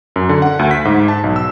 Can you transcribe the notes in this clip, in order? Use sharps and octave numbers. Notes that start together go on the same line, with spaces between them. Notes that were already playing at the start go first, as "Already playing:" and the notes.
F#2
D3
F#5
D2
B6
G#2
A5
B1
E6